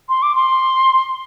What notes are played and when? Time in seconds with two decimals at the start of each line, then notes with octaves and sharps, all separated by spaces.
0.09 C6
0.22 D6
0.35 C6